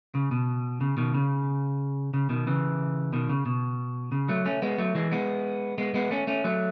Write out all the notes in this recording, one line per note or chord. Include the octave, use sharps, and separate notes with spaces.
C#3
B2
C#3
B2 D#3
C#3
C#3
B2 D#3
C#3 E3
B2 D#3
C#3
B2
C#3
F#3 A3
A3 C#4
G#3 B3
F#3 A3
E3 G#3
G#3 B3
G#3 B3
G#3 B3
A3 C#4
A3 C#4
F#3 A3